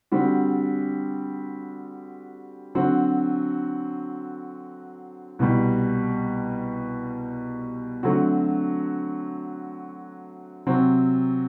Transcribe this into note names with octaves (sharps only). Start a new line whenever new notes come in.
D3 G3 C4 F#4
D3 F#3 C4 F#4
C2 B2 G3
D3 F#3 A3 C4 F#4
C3 F#3 C4